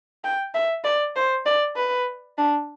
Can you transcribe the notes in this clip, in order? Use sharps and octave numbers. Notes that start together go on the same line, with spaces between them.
G5
E5
D5
C5
D5
B4
D4